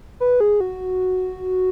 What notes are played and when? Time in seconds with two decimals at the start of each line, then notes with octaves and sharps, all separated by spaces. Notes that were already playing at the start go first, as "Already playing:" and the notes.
0.20 B4
0.40 G#4
0.60 F#4